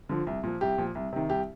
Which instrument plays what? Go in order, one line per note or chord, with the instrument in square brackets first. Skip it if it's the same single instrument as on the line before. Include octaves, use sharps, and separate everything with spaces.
[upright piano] D3 F3
C2
A#2 F3
C2 G4
A#2 F3
C2
C3 D#3
C2 G4